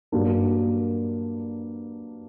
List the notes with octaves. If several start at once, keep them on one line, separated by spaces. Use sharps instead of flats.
G2 F#3 A#3 D4 A#4